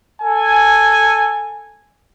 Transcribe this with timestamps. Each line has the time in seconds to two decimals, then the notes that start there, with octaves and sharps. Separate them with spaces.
0.22 A4 G#5